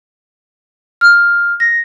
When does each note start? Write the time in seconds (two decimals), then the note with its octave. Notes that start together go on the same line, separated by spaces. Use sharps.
1.01 F6
1.60 A#6